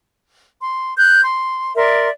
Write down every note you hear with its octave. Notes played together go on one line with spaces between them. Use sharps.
C6
F#6 G6
C6
A#4 D5 E5 C6